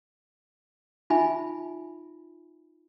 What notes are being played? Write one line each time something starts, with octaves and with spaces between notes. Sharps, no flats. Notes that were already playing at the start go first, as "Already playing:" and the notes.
D#4 F4 E5 G#5 B5